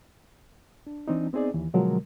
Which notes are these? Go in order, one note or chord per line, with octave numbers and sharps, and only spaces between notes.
D4
E3 C4 D4 D#4
B3 C4 D#4 G#4 D5
D#2 E3
B2 D3 F3 F#3 G#3 A#4